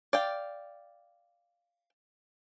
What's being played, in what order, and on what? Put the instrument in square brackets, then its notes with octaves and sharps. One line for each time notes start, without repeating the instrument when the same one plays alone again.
[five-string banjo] D5 F5 G5